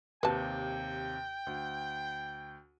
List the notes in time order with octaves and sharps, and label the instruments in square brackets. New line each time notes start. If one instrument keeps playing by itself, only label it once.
[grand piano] D#2 C3 [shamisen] B4 A5 [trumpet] G5
[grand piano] D2